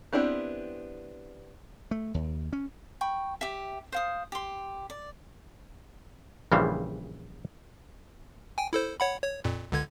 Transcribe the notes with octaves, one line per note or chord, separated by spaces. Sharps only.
B3 C4 D4 E4 G4
A3
D#2
C#4
G5 B5 C#6
G4 E5
C5 F5 D#6
G4 C6
D5
A#1 C#3 E3 G3 C5 F5
G5 G#5
E4 A4 C5
C#5 F#5 B5
C#5
F2 A#2
C#2 D3 G#6